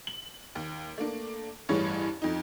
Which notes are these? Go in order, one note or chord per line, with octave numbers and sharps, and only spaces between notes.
F#7
D#2
A3 A#3 D4
A1 G2 E3 G#4 C#5
F2 D#4